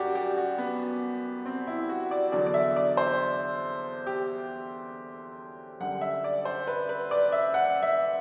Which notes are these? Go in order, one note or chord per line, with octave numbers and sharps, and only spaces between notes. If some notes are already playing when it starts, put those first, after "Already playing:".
Already playing: F#2 G3 F#4 G4 D5
G4
F#4
B3
C4
E4
F#4
D5
E2 D3 F#3 D5
D5
E5
D5
C5
G4
F#2 D3 G3 F#5
E5
D5
C5
B4
B4
D5
E5
F#5
E5